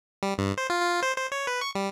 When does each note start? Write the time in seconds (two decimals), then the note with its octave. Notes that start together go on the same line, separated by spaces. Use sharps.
0.23 G3
0.38 G2
0.58 C5
0.70 F4
0.82 F4
1.03 C5
1.18 C5
1.32 C#5
1.47 B4
1.61 C#6
1.75 G3